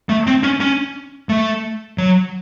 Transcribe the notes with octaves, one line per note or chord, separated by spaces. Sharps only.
A3
C4
C#4
C#4
A3
F#3